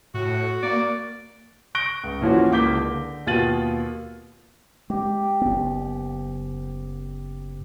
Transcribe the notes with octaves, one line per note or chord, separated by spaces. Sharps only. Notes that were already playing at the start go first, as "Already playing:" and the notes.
A2 F#4
A#3 D5
C#6 F#6 A#6 D7 G7
C#2
A#2 E3 F3 C#4 E4 F#4
C#2 A#3 D6 G6 B6 G7
D3
D#2 B2 F4 A6 D#7 F#7
G#3 G4
F#1 B3